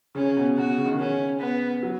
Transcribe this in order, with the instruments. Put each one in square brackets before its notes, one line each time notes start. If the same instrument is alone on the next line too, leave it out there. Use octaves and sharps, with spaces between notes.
[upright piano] C#3 [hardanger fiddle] C#4
[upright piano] B2
[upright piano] B2 [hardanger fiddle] F#4
[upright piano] C#3
D#3
C#3
[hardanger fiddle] C#4
B3
[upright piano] F#3